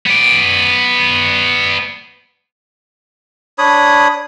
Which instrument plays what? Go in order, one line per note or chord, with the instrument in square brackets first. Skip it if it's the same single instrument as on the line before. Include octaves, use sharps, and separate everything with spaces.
[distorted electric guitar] B3 D5
[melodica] D4 C#5 B5 D#6